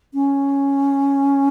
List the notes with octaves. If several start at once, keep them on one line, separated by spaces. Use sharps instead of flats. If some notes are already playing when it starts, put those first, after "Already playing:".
C#4